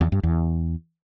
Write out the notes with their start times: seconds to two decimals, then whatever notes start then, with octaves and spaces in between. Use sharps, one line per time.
0.01 E2
0.12 G2
0.23 E2